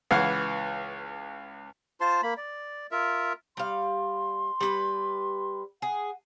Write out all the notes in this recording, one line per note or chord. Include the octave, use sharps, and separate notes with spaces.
C#2 E3 F5 F#5
F4 C5 A5 C6
A#3 B5
D5
F4 A#4 E5
G3 F5 C6
G3 B4
G#4 F#5